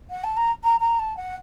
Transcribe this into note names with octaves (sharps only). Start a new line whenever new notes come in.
F#5
A5
A#5
A#5
A#5
A5
F#5